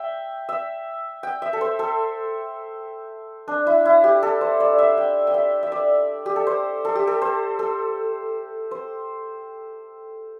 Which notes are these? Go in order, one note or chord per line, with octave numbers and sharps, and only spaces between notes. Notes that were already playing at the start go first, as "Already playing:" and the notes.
Already playing: E5 G5
E5
G5
E5
A4
C5
A4
D4
E4
E4
G4
A4
C5
D5
E5
G5
G5
E5
E5
D5
G4
A4
C5
A4
G4
A4
C5
A4
C5